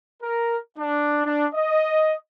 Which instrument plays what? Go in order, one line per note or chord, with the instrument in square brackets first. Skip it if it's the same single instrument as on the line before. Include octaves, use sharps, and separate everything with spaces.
[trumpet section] A#4
D4
D4
D#5